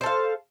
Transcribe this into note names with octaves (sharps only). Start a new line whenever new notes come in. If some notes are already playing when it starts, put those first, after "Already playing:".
A4 C5 F5